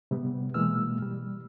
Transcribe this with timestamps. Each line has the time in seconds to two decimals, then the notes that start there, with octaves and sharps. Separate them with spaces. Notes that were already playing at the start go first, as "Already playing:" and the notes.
0.11 C3 G3 B3
0.54 B2 E3 G#3 A#3 E6 F6
1.02 G3